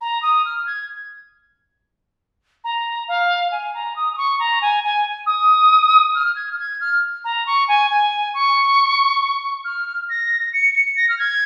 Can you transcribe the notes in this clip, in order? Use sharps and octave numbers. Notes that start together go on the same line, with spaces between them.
A#5
D#6
F6
G#6
A#5
F5
G#5
A#5
D#6
D#6
C#6
A#5
G#5
G#5
D#6
F6
G#6
F6
G#6
F6
A#5
C#6
G#5
G#5
C#6
F6
A#6
C#7
C#7
A#6
F6
G#6